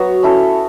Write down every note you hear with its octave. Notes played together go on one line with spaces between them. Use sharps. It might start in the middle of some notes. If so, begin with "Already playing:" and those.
Already playing: F#3 B3 F#4 C#5
C#4 E4 A4 C#5